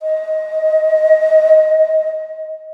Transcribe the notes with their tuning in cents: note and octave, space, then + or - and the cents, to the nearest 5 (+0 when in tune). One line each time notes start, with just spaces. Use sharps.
D#5 +20